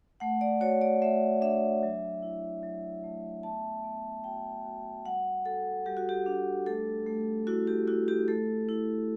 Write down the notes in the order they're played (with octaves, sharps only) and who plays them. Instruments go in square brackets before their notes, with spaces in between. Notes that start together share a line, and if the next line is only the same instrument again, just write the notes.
[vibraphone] A3 F#5
D5
F#4 C#5
D5
A3 E5
D4 E5
F#3
E4
F#3
A3
B3 A5
B3
F#4 G5
F#4
G3 F#5
F#4 A4
G3 G4
F#4
G4
D4
A3 A4
A3
E4 F#4
G4
E4 F#4
G4
A3 A4
E4